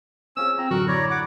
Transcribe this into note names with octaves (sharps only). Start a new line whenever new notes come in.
C4 C#4 F4 G#4 E6
C4 F4 A#5
A1 F#2 D3 F#4 A#4
E4 C#5 D5 A#5
F#5 D6